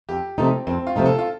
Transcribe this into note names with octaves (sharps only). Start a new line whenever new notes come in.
F2 G4
C3 F3 A3 C4 D#4
F2 C4
F4
C3 F3 A3 D#4
A4
F4